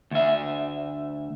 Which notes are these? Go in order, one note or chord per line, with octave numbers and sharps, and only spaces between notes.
D2 E5